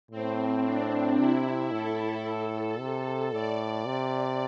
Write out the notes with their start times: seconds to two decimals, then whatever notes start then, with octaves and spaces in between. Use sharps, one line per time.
0.11 A2 C4
0.65 D4
1.18 C3 E4
1.72 A2 A4
2.80 C3
3.33 A2 D5
3.87 C3